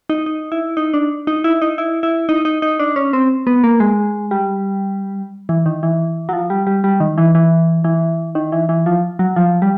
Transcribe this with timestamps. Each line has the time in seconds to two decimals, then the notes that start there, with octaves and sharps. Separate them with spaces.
0.10 D#4
0.26 D#4
0.52 E4
0.77 D#4
0.94 D4
1.27 D#4
1.44 E4
1.62 D#4
1.78 E4
2.03 E4
2.29 D#4
2.45 D#4
2.62 D#4
2.80 D4
2.96 C#4
3.13 C4
3.47 B3
3.64 A#3
3.80 G#3
4.31 G3
5.49 E3
5.66 D#3
5.83 E3
6.29 F#3
6.33 F3
6.50 G3
6.67 G3
6.84 G3
7.00 D#3
7.18 E3
7.35 E3
7.84 E3
8.35 D#3
8.52 E3
8.69 E3
8.86 F3
9.19 F#3
9.36 F3
9.62 G3